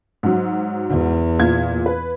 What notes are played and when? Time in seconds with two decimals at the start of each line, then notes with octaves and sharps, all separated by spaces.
0.23 G#2 F#3
0.90 E2
1.39 A#2 G#6
1.86 B4